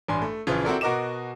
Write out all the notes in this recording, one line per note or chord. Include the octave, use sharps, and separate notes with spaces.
A1 G2 D4 G#5 C6
A3
A#1 C#3 E3 F4 G#4
C4 E4 F#4 A4 A#4 D5
B2 F#4 A#4 D#5 D6 E7